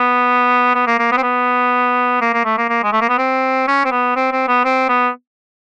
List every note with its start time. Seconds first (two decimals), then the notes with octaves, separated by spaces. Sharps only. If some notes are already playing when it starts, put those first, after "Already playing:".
Already playing: B3
0.75 B3
0.87 A#3
0.99 A#3
1.12 B3
1.17 C4
1.23 B3
2.21 A#3
2.33 A#3
2.45 A3
2.58 A#3
2.69 A#3
2.83 G#3
2.92 A3
3.01 A#3
3.09 B3
3.18 C4
3.68 C#4
3.85 C4
3.92 B3
4.16 C4
4.32 C4
4.48 B3
4.64 C4
4.89 B3